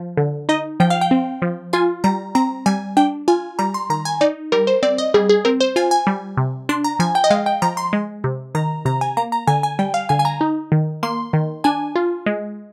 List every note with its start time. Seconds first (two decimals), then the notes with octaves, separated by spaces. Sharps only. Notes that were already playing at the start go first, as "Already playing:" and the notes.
Already playing: F3
0.17 D3
0.49 D#4 D#5
0.80 F3 G5
0.90 F5
1.01 G5
1.11 C4
1.42 F3
1.73 F4 G#5
2.04 G3 A#5
2.35 C4 A#5
2.66 G3 G#5
2.97 D4 G5
3.28 F4 G#5
3.59 G3 A#5
3.74 C6
3.90 D#3 A#5
4.05 G#5
4.21 D#4 D5
4.52 G3 A#4
4.67 C5
4.83 C4 D5
4.98 D#5
5.14 G3 G#4
5.29 G#4
5.45 C4 A#4
5.61 C5
5.76 F4 G#5
5.91 G#5
6.07 G3
6.37 C3
6.69 D4 C6
6.84 A#5
6.99 F3 G#5
7.15 G5
7.24 D#5
7.30 G#3 F5
7.46 G5
7.62 F3 A#5
7.77 C6
7.93 G#3
8.24 C3
8.55 D#3 A#5
8.85 C3 A#5
9.01 G#5
9.17 A#3 A#5
9.32 A#5
9.47 D3 G#5
9.63 G#5
9.79 G3 G5
9.94 F5
10.09 D3 G#5
10.19 G#5
10.25 A#5
10.41 D#4
10.72 D#3
11.03 A#3 C6
11.33 D#3
11.64 D4 G#5
11.96 F4
12.26 G#3